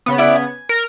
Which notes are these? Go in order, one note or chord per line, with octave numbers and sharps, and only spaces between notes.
C#3 B3
E4 D5 E5
G#5
A#4